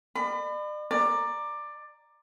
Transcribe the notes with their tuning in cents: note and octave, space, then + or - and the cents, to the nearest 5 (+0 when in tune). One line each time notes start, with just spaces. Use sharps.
D5 +45 B5 +30
D5 +15 A#5 +0